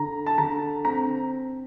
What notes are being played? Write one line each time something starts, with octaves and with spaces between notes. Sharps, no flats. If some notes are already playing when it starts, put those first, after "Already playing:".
Already playing: D3 A#5
A5
D3 A#5
C4 A#5